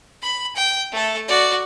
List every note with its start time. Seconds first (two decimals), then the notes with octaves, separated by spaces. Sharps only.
0.22 B5
0.56 G5
0.92 A3 A4
1.28 F#4 D5